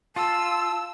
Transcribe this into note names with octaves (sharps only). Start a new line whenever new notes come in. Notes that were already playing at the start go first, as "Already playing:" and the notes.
F4 A5 E6